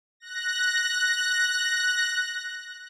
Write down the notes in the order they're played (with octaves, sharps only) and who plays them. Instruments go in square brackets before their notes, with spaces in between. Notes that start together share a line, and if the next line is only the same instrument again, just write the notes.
[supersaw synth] F#6 A#6